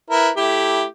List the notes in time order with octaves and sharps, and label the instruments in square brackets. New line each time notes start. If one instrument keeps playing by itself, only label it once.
[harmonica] E4 A#4 B4
A3 E4 G4